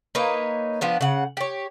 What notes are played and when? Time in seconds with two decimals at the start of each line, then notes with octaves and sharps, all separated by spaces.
0.15 A#3 D#4 B4 C#5
0.81 F3 B3 D4
1.01 C#3 F#5
1.37 G4 C#5